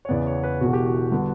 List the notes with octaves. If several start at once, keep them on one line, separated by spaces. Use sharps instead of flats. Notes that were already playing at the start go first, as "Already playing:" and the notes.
C#5
E2 C#3 E3 B3 D5
C#5
B4
E1 E2 B2 F#4
G4
F#4
D3 G3 B3